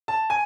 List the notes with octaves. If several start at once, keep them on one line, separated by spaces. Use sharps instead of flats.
A5
G#5